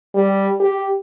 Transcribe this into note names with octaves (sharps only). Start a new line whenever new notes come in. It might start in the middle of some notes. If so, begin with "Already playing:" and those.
G3
G4